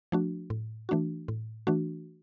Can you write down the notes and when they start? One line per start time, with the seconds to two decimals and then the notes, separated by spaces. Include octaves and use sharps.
0.12 F3 A3 D4 F#4
0.50 A2
0.89 E3 A3 D4 F#4
1.28 A2
1.67 E3 A3 D4 F#4